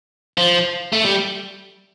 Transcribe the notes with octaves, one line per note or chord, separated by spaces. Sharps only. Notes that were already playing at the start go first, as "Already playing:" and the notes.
F3
A3
G3